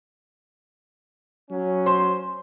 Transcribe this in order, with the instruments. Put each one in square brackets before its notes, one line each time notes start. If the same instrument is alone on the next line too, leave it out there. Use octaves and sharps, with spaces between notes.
[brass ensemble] F#3 C#4
[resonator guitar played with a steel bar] C5